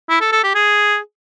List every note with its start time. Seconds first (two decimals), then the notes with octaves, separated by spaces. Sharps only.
0.10 E4
0.21 A4
0.32 A4
0.44 G4
0.55 G#4